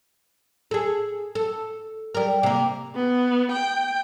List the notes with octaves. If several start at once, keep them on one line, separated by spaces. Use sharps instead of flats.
G#4 A4
A4
G3 A#4
C3 A#3
B3
G5